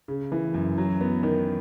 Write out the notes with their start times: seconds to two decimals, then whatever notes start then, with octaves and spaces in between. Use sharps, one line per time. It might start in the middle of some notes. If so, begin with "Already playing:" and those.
0.08 C#3
0.32 E3
0.54 F#2
0.78 F#3
1.01 B3
1.23 D#3